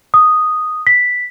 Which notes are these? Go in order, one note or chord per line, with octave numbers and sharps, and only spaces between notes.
D#6
B6